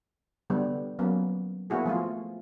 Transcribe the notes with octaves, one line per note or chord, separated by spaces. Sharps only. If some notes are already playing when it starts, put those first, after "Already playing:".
D3 G3 B3
F#3 A#3 B3 C#4
A#3 B3 E4 F#4 G#4
F3 A3 F4